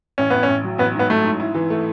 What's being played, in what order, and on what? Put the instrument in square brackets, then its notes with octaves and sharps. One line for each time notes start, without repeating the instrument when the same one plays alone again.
[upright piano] A1 [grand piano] C#4
[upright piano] A1 [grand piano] B3
[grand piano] C#4
[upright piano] A1
F#3
[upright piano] A1 [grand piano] B3
[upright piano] G#2 [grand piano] B3
[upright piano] F#3 [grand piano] A3
[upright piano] G#2
E4
E3
A3